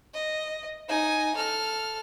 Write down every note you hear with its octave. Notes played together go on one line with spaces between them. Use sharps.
D#5
D#4 G#5
A4 F6